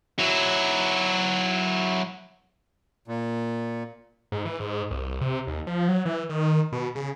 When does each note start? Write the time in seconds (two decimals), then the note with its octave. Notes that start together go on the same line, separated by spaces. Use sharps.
0.19 F#3 E4
3.08 A#2
4.32 G#2
4.45 E3
4.60 G#2
4.91 C2
5.21 C3
5.47 D#2
5.67 F3
5.88 F#3
6.05 E3
6.29 D#3
6.72 B2
6.95 C#3